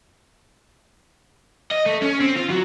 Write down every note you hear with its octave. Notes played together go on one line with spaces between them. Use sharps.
D#5
A3
C#4
C4
F4
F#3